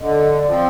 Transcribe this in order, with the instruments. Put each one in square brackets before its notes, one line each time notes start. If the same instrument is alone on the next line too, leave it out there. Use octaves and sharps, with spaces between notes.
[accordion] D3 [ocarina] D#5
[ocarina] D5
[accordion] F3 C4